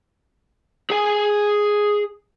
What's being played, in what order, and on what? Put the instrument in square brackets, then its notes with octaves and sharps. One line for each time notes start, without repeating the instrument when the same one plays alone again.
[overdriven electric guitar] G#4 G#5